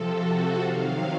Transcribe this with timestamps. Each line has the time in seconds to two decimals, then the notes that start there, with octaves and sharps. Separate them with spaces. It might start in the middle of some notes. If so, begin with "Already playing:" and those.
Already playing: C3 F3 A4
0.11 F#4
0.62 C3 D#3 F#3 F5